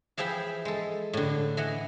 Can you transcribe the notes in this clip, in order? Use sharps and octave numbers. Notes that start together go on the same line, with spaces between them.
E3 F3 G#4 E5 G5 B5
G#3 A4
A2 D3
E3 D#5 F#5